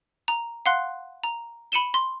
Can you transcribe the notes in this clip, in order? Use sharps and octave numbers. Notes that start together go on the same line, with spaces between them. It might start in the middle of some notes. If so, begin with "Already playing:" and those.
A#5
F5 F#5 C6 F#6
A#5
B5 C#7 D#7 E7 G7
C6